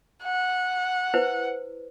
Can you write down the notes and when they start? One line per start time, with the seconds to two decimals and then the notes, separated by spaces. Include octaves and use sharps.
0.23 F#5
1.14 E4 B4 C5